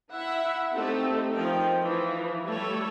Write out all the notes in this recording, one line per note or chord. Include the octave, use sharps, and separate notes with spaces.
E4 E5 F#5
A3 C4 D#4 G4 A4
D#3 F3 D#4 G5
E3 F3
G3 A3 A4 C#5